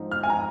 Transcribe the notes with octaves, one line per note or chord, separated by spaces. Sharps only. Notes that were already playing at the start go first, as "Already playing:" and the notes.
Already playing: G#2 F3 C4 D#4
F6
G#5
A#5